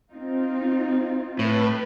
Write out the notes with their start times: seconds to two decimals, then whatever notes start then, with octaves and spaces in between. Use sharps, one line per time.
0.11 C4 D#4 F4
1.39 A2 B4